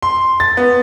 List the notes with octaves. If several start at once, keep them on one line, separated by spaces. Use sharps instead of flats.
C6
A6
B3